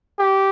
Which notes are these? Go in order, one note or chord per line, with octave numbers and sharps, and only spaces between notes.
G4